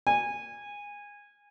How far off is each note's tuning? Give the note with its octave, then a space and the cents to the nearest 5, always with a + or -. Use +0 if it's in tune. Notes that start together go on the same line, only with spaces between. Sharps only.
G#5 -20